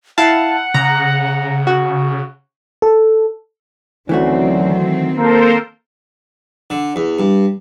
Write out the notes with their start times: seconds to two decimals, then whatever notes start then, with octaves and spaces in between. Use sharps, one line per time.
0.18 E4 F5 F#5 A5
0.74 C#3 A#5
1.67 F#4
2.82 A4
4.09 D2 D#3 E3 F#3 A3 C4 C#4 F#4
5.16 A#3 A4 A#4 C5
6.70 D3
6.96 E2
7.19 G2